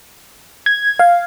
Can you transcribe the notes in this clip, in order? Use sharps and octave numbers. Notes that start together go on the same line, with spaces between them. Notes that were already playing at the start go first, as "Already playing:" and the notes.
G#6
F5